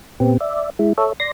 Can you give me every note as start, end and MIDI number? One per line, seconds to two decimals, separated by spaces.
0.20 0.37 46
0.20 0.37 59
0.20 0.37 60
0.20 0.37 67
0.40 0.70 74
0.40 0.70 76
0.79 0.93 56
0.79 0.93 64
0.98 1.13 69
0.98 1.13 73
0.98 1.13 76
1.20 1.31 74
1.20 1.31 84
1.20 1.31 94